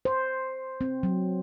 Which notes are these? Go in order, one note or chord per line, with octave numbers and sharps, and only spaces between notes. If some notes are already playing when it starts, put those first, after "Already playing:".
C5
C4
F#3